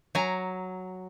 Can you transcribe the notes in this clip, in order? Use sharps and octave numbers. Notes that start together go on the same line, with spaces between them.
F#3 G#5 A#5